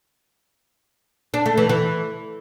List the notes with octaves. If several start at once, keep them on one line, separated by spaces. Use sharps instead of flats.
D4
A3
E3
E3